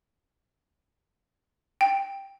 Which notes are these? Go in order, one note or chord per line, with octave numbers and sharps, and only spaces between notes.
G5